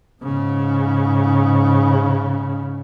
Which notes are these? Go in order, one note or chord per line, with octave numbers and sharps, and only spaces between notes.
G#2 C#3